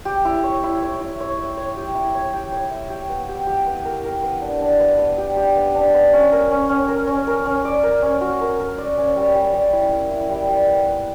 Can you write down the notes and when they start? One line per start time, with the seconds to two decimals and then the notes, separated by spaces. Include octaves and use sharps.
0.05 G4
0.25 E4
0.44 C#5
0.63 E4
0.82 C#5
1.00 E4
1.20 C#5
1.38 E5
1.57 C#5
1.77 G4
1.95 E4
2.15 C#5
2.33 G4
2.52 C#5
2.71 E5
2.90 G4
3.09 B3
3.29 G4
3.47 G4
3.67 B3
3.85 A#4
4.05 A#4
4.23 B3
4.41 D4
4.61 D4
4.80 B3
4.99 B3
5.18 G4
5.37 G4
5.56 B3
5.75 D4
5.94 B3
6.13 C#4
6.32 A#4
6.51 C#4
6.69 C#4
6.88 A#4
7.07 C#4
7.27 A#4
7.46 C#4
7.65 D5
7.83 A#4
8.02 C#4
8.21 F#4
8.41 A#4
8.60 A#4
8.78 D5
8.98 C#4
9.16 G3
9.35 G3
9.53 G3
9.72 E4
9.92 E4
10.11 E4
10.30 G3
10.49 G3
10.68 B3
10.86 B3